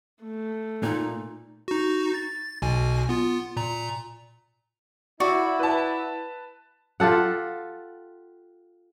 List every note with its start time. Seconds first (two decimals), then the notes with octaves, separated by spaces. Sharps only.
0.22 A3
0.83 A#2 D#4
1.68 D#4 F#4
2.14 A6
2.62 B1 B2 G#5
3.09 B3 F4
3.57 A#2 A#5
5.20 E4 F#4 D5
5.59 B4 A5
7.00 F4 G4 A4 F#5